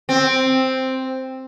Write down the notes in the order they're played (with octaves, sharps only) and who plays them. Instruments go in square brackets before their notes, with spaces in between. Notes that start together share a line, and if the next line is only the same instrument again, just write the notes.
[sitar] C4